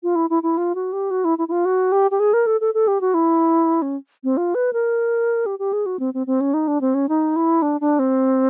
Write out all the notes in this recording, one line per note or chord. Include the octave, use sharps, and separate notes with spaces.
F4
E4
E4
E4
F4
F#4
G4
F#4
E4
E4
E4
F4
F#4
G4
G4
G#4
A#4
A4
A4
A4
G4
F#4
E4
C#4
C4
F4
B4
A#4
G4
G4
G#4
F#4
C4
C4
C4
C#4
D#4
D4
C4
C#4
D#4
E4
D4
D4
C4